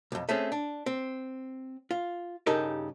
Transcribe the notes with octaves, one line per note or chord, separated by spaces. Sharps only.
B1 F2
A3 C4 C#4 G#4
D4
C4
F4
G2 C#3 D#4 G4 A4 A#4